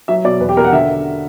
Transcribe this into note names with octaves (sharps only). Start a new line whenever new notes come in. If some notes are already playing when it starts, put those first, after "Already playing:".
F#3 E5
B2 D5
E2 B4
G4
B2 A#4
F#5
D3 E5